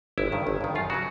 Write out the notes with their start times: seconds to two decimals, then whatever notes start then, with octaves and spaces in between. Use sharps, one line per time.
0.18 G1 E4
0.32 G2 D#3
0.47 G1
0.61 G2 D#3
0.75 F#2 F4
0.90 C#3 F#3 F#4